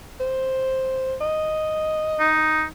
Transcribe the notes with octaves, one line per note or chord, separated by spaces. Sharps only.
C5
D#5
D#4